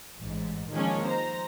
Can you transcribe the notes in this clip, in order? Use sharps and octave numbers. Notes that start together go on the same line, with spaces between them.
A1 G#2
D#3 F3 G#3 A#3 C#4 D4
C5 A#5